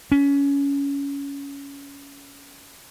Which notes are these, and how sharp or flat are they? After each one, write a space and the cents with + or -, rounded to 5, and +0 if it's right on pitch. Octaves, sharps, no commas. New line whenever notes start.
C#4 +20